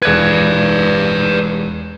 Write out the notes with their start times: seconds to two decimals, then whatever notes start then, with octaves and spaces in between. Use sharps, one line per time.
0.02 E1 B4 D5 F#6 G#6